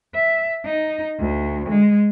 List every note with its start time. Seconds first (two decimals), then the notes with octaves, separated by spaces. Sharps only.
0.14 E5
0.65 D#4
1.19 D2
1.69 G#3